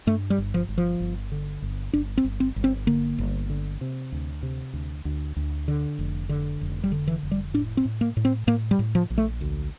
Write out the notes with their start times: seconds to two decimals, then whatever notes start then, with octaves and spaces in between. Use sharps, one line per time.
0.07 G2 A3
0.30 G3
0.38 G1
0.54 F3
0.69 G1
0.78 F3
1.00 G1
1.32 D3
1.62 G1
1.93 G1 D4
2.17 C4
2.24 G1
2.40 C4
2.56 G1
2.64 C4
2.87 D3 A#3
3.18 G1
3.50 D3
3.81 C3
4.12 D2
4.43 C3
4.73 D2
5.05 D2
5.36 D2
5.68 D3
5.99 F1
6.29 D3
6.61 F1
6.84 G3
6.92 D3
7.07 E3
7.23 F1
7.31 G3
7.54 A2 D4
7.77 C4
7.85 A2
8.01 A#3
8.17 A2
8.25 C4
8.47 A2 A#3
8.71 G3
8.79 A2
8.95 F3
9.10 A#1
9.18 A3
9.41 D2